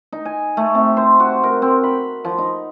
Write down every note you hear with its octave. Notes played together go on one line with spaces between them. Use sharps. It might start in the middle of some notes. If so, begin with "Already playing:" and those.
D#4
G#5
A3
C3
C5
F#4
A#4
C4
B5
F3
D#4